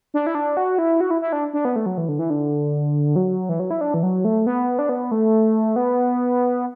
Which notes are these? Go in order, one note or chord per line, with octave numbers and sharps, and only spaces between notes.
D4
E4
D4
F#4
E4
F#4
E4
E4
D4
D4
B3
A3
F#3
E3
D3
E3
D3
F#3
E3
F#3
E4
D4
E3
F#3
A3
B3
D4
B3
A3
B3